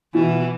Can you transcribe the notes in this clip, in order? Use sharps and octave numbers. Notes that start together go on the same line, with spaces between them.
B2 E3